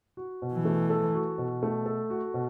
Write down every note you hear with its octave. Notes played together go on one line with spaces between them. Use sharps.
F#4
B2
E3
A3
A4
F#4
B2
A3
A4
F#4
B2